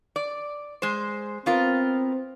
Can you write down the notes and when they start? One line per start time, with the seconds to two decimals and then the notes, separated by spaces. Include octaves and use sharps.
0.16 D5
0.82 G#3 C5
1.46 B3 C4 F4 A#4